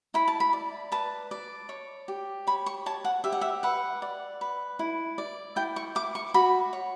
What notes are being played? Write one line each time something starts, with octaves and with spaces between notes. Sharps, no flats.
E4 B5
A5
B5
D5
B4 A5
D5
C#5
G4
C#5 B5
C#6
C#5 A5
F#5
G4 E5
F#5
E5
B4 F#5
D5
B4
E4
D5
E4 G5
C#6
E4 D6
C#6
F#4 B5
C#5